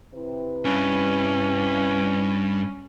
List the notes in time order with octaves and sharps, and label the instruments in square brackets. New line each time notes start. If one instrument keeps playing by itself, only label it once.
[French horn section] C3 E4 B4
[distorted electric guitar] G2 [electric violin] C#4